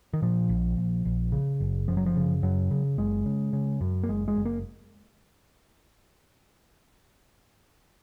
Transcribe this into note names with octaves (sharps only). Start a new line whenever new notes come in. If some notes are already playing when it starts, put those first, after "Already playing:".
D#3
A#2 F3
A#1
A#1
A#1
C#3
F#1
F#2 F3
F#3
F3
C#3
F#2 F#3
C#3
F#1 G#3
C#3
C#3
F#2
A#3
F#1 G#3
G#3
F#1
A#3